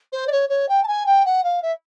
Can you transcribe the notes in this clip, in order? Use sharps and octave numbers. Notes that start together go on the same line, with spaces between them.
C5
D5
C#5
C#5
G5
A5
G#5
G5
F#5
F5
E5